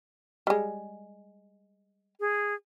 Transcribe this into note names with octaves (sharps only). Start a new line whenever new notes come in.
G3 G#3
G#4